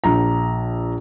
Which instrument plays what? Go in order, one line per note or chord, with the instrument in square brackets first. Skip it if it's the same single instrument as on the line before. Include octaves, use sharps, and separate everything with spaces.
[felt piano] A#1 A#5